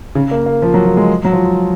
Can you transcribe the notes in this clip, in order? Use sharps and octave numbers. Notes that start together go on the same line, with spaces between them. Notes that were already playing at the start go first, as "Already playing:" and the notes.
C#3
A#3
A#3
F3
F#3
F3
G#3
F#3
F3